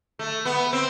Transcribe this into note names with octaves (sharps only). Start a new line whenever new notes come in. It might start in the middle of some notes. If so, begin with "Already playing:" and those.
A3
B3
C4